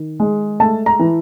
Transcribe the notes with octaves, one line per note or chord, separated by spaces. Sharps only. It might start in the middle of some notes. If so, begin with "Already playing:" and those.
Already playing: D#3
G#3
A3 A5
A#5
E3